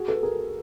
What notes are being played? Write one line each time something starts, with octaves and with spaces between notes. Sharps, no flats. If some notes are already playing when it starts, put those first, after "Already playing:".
Already playing: F#4 G#4
A4 B4
G#4 A#4